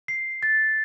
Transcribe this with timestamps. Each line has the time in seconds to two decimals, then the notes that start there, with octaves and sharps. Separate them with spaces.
0.08 C7
0.43 A6